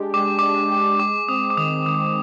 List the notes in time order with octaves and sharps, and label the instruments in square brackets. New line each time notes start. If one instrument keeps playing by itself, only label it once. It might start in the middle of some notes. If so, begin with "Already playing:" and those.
Already playing: [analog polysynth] G#3 D4 G4
[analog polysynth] G#3 [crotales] D6
[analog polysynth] D4 [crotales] D6
[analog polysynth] G4
[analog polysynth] G#3 [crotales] D6
[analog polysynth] C4 [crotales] D#6
[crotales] D6
[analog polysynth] D#3 [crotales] D#6
[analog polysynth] D#3 [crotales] D#6